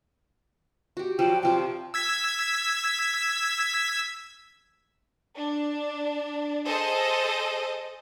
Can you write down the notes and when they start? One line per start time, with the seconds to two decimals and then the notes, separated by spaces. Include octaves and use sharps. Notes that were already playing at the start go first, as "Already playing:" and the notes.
0.97 F#4 G4
1.19 F3 F#3 D5 G5
1.43 C3 F3 G5 D6
1.94 E6 G#6 B6
5.34 D4
6.66 G#4 A4 C5 D#5